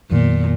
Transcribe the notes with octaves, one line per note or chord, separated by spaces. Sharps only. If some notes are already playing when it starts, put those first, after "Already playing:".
F2 A#2 D#3 F#3 B3